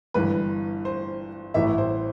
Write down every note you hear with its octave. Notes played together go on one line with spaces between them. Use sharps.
G1 G2 E3 B4
C5
A1 A2 E3 G3 E5
C5